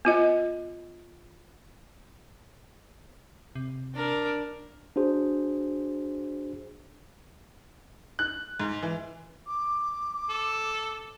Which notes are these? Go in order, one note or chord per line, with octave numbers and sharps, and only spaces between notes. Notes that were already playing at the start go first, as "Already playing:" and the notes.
B3 F4 D#5
C3
D4 A#4
D4 F#4 G#4 C5
F#6
G#2
E3
D6
A4